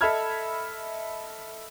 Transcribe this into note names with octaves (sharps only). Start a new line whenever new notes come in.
A4 D#5 E5 B5 F6 G#6